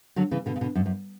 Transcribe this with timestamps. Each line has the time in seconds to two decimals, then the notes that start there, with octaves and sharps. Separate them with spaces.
0.16 D3 F#3
0.31 C#3 E3
0.46 B2 D3
0.56 C#3
0.61 B2 D3
0.75 F#2
0.86 F#2